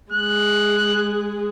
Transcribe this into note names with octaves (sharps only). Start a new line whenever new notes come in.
G#3 G#4 F#6